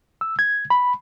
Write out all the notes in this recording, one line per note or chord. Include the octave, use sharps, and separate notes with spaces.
E6
G#6
B5